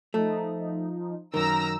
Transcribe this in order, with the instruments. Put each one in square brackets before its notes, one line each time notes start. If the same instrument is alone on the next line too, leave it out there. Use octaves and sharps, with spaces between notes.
[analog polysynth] F3 D#4 [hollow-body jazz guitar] A3
[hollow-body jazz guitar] F#2 D#3 [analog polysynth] A#4 [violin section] A#5 E6 A#6